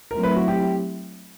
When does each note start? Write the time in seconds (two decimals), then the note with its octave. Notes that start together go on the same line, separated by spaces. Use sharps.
0.11 F#3 A3 C4 E4 A#4
0.23 B4
0.36 F#4
0.48 G4